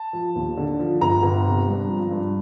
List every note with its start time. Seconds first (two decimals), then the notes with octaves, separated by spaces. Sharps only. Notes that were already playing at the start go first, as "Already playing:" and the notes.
Already playing: A5
0.13 F3
0.35 D#2
0.57 D3
0.80 F3
1.01 G1 A#5
1.23 G1
1.45 C3
1.68 G2
1.89 F3
2.11 G2